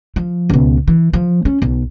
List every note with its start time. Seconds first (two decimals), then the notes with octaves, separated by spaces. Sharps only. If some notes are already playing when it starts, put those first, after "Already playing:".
0.16 F3
0.50 C#2 B2
0.88 E3
1.13 F3
1.45 C#4
1.62 B1